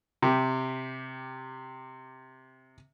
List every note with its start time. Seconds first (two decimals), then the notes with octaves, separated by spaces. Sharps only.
0.22 C3 G4